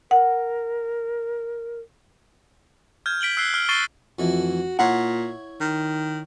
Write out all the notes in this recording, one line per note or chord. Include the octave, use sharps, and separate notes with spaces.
A#4 F#5
F6 G6 G#6
B6 D7 F#7 G7
E6 F#6 C7 G7
F6
C#6 A6 C7 D#7 G7
F2 E3 A3 F#4
A#2 E4 C#5 F#5
D#3